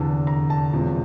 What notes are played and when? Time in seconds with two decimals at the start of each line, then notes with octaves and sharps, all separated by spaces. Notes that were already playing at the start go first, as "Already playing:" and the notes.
Already playing: F1 E2 D3 A5
0.27 A#5
0.50 A5
0.73 E1 E2 C3 F3